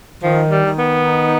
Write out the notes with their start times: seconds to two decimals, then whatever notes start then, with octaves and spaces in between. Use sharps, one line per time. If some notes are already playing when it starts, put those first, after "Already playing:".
0.23 D#3 F3
0.51 G3
0.65 D#3
0.78 B3
1.06 D#4